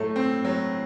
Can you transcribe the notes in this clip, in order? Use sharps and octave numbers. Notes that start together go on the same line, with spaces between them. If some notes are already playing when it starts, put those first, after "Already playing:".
Already playing: A2 F#3 A3
C4
F#3